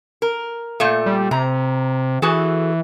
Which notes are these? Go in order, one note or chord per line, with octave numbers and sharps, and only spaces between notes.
A#4
A#2 A3
G3
C3 A#5
E3 F#4 G#4 A4